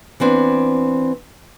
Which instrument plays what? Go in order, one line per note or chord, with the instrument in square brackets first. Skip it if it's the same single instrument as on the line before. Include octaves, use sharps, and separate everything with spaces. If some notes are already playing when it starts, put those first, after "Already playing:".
[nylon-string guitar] E3 B3 C4 D4